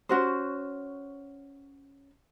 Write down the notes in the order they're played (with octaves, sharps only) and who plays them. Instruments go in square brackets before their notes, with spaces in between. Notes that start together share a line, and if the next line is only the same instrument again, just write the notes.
[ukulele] C#4 F#4 C5